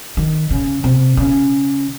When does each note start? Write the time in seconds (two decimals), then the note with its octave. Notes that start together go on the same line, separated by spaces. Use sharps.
0.17 D#3
0.51 C#3
0.84 C3
1.17 C#3